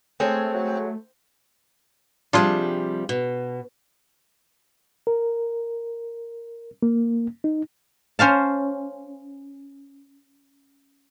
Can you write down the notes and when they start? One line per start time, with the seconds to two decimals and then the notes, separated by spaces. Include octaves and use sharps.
0.20 G#3 A3 C4 A4 C#5 G#5
0.54 F#3
2.33 C3 F3 G3 D4 F4 G#4
3.09 B2
5.07 A#4
6.83 A#3
7.44 D#4
8.19 C#4 C5 F5 A5